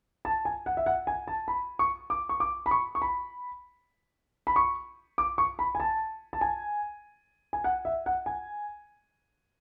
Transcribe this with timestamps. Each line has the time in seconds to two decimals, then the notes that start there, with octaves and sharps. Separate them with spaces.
0.25 A5
0.45 G#5
0.66 F#5
0.77 E5
0.86 F#5
1.07 G#5
1.28 A5
1.48 B5
1.79 C#6
2.10 D6
2.29 C#6
2.40 D6
2.66 B5
2.71 C#6
2.95 C#6
3.02 B5
4.47 B5
4.56 C#6
5.18 D6
5.38 C#6
5.59 B5
5.75 G#5
5.80 A5
6.33 A5
6.41 G#5
7.53 G#5
7.64 F#5
7.85 E5
8.06 F#5
8.26 G#5